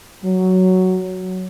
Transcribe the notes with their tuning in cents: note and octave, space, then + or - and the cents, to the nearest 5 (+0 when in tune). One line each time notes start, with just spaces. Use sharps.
F#3 +5